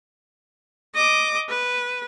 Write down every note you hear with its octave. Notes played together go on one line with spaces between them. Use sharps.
D#5 D6
B4